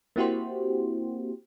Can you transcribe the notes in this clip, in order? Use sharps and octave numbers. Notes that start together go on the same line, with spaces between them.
A#3 C4 E4 F#4 G4 C5